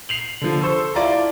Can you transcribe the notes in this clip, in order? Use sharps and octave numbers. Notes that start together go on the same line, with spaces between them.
C7 F7 F#7
D3 F3
A4 C5 C#6 E6
E4 F4 D5 F5 A5 A#5